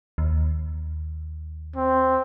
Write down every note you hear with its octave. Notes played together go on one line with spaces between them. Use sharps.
D#2
C4